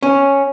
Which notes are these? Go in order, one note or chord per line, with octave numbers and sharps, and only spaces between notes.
C#4